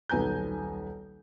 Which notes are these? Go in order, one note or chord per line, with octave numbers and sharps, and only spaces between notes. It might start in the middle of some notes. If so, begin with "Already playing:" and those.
D#1 B1 B3 G#5 A#5 G6